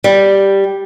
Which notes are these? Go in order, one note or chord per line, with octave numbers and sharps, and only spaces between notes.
G3